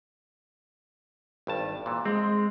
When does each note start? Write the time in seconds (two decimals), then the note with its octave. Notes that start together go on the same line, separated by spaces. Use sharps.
1.47 G#1 G2 A5
1.86 A#2 E3
2.05 G#3 C4